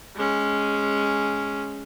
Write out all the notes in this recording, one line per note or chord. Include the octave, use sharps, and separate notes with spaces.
G#3 C#4